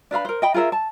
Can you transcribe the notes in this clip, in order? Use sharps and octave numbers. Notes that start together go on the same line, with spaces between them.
D4 B4 F5 B5
A#4 C5
D#5 G5 B5
F4 G#4 A#4 E5
A5